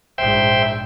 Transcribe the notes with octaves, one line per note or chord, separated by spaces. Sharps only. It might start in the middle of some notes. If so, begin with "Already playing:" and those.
A#1 G#2 C5 E5 G5